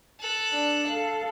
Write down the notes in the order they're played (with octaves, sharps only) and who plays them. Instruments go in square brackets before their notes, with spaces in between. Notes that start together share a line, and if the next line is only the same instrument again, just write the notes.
[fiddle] A4 F#6
[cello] D4
A4 F5